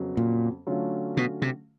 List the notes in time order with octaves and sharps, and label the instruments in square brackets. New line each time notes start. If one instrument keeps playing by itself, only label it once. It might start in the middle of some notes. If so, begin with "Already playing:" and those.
Already playing: [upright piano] F2 C#3 F#3 B3
[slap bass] A#2
[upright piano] D3 F#3 A3 C#4 F4
[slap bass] B2
C3